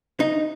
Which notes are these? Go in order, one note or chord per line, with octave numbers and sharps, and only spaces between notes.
D#4